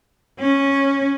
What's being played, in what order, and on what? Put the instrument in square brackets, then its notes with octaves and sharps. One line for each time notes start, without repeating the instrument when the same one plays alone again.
[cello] C#4